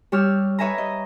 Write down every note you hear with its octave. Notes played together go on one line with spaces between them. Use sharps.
G3 G4 C#5 E6 F6
B4 C#5 D#5 E5 G#5 A#5
D#5